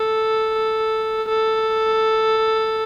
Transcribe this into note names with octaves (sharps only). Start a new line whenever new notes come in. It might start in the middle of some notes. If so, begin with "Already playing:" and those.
Already playing: A4
A4